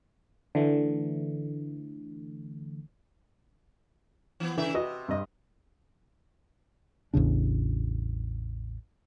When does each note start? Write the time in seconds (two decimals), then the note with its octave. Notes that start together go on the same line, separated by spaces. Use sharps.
0.55 D3 E3 A3
4.40 E3 B3
4.58 C#3 E3 E5
4.74 C3 F#4 B4 D#5
5.08 G2 D#5
7.14 A1 E2 C#3 D4